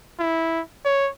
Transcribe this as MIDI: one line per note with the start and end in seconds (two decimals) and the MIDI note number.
0.19 0.61 64
0.85 1.10 73